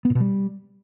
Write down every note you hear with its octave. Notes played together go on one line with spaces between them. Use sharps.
B3
A#2
B2
G3